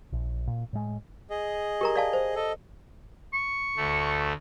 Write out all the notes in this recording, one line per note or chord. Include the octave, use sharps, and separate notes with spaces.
A#1
A#2
A2 G#3
G#4 D#5
G4 A#4 A#5
D5 F5 A5
C5
A4 D#5
C#6
D2 A3